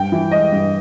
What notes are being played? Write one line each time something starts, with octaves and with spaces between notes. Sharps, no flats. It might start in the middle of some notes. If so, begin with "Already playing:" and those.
Already playing: G2 G5
E3
G#3 D#5
G2